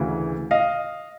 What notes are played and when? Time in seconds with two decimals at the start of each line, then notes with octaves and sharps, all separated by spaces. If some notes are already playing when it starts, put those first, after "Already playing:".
Already playing: D2 C#3 E3
0.51 D#5 F5